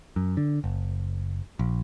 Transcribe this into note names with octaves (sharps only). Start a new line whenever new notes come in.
F#2
D3
F#1
A#1